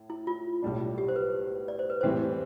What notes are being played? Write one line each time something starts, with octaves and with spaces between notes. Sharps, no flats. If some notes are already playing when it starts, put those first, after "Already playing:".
Already playing: A2
E4
F4
B1 A2 G3 D4
G4
C5
B4
D5
C5
B4
A2 E3 G3 C4 G4 C5